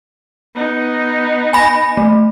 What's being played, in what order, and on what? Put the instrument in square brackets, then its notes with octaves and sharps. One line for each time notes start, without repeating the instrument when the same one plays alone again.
[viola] B3 D#4
[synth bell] G#5 B5 A#6
A3